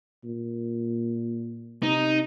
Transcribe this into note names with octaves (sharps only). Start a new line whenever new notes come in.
A#2
C3 D#4